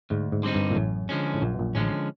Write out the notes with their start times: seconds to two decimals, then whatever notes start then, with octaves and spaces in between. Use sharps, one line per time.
0.10 D2 G#2
0.32 G#2
0.43 D3 G3 C4 D#4
0.55 G2
0.70 A#2
0.76 A1 F#2 A2
1.09 D3 F3 G#3 C#4
1.34 A2
1.42 A#1 F#2 A#2
1.54 B2
1.59 A#1 A#2
1.75 A1 A2 D3 F3 G#3 C#4